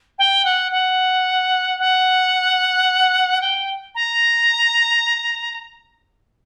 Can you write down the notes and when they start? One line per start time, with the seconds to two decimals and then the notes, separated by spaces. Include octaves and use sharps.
0.18 G5
0.45 F#5
0.71 F#5
1.80 F#5
3.41 G5
3.95 A#5